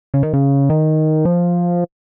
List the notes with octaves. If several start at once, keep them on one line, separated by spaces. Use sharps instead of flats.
C#3
D#3
C#3
D#3
F3